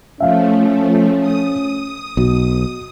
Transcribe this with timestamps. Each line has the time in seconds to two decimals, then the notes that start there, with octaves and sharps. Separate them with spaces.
0.20 F3 A3 C#4 E5 F5
1.20 D#6
2.17 B1 B2